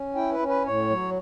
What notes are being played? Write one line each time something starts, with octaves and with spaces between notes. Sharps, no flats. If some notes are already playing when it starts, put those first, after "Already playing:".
Already playing: C#4
E4 G5
B4
C#4
B4
A2 C#5
F#3